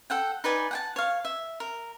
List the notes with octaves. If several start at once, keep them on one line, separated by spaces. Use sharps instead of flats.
A4 F#5 G5
D#4 B4 D5 G#5
F#5 G5 A5
C#5 F5
E5
A#4